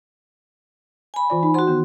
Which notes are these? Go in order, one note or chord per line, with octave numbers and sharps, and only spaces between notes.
G#5 B5
E3 F4 D5
D#4
F#4 C5 F#5 C6
D#3 B3